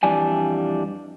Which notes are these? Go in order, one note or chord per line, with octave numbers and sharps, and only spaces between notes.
F2 E3 G3 D4 G#5